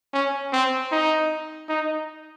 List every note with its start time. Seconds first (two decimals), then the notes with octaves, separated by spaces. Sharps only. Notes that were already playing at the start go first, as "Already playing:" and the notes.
0.13 C#4
0.53 C4
0.92 D#4
1.69 D#4